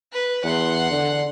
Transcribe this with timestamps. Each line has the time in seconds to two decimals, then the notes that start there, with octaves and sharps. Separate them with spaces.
0.12 B4
0.44 E2 F#5 C6
0.91 D3